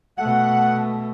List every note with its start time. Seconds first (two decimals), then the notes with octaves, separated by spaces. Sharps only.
0.18 B2 A3 F#5